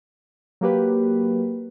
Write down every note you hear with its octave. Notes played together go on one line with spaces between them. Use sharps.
F#3 A#3 G4 B4